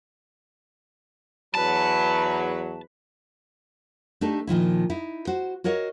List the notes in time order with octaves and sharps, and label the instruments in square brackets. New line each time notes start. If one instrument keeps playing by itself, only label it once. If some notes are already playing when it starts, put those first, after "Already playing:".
[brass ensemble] E2 F#3 [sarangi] B4 [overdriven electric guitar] A5
[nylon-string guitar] A3 D4 D#4 G4 A4
A#2 D#3 F3 E4
D#4 E4
F#4 C5
F#4 A#4 C#5 D#5 F5